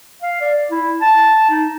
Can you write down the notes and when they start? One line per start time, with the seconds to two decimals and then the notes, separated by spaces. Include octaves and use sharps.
0.22 F5
0.41 D5
0.71 E4
1.02 A5
1.50 D#4